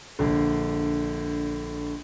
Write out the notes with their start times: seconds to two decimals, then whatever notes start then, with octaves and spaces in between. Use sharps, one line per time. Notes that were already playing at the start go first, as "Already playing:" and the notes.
0.19 A#1 D3